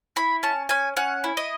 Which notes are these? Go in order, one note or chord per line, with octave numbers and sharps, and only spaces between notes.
E4 B5
C#4 A5
C#4 G#5
C#4 F#5
E4
D#5